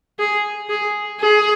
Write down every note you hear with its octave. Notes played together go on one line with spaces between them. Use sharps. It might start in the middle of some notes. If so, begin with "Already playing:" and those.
G#4
G#4
G#4